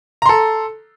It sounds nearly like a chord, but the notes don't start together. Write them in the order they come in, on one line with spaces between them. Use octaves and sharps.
A#5 C6 A4